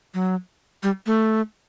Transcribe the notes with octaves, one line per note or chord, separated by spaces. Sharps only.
F#3
G3
A3